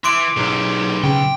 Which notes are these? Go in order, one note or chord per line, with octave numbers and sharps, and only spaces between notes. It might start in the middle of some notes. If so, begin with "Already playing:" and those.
E3 C6 D6 D7
B1 D#4 G4 G#4
C#3 G5